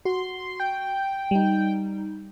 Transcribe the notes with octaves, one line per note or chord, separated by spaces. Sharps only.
F#4 C6
G5
G3 D#4